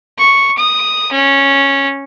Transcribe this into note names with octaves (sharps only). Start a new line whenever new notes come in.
C#6
D#6
C#4